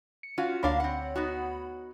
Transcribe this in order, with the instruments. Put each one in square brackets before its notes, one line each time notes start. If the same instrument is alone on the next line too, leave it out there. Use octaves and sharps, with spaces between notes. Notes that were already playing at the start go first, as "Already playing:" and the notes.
[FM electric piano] C#7
[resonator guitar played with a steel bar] C#4 F4 F#4
[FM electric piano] D2 C#5 B5 [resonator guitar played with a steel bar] A#3 D4 F5
[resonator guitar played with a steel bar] C4 F#5
B3 D#4 F#4